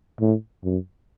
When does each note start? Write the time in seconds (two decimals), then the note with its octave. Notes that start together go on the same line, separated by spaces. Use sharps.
0.20 A2
0.64 F#2